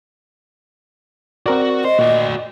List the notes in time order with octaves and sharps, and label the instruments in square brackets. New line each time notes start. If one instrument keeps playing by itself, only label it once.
[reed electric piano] C4 A#4 D5 [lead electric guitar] F#4
[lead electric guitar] C5 [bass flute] D#5
[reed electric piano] A#2 [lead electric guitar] F#4 D5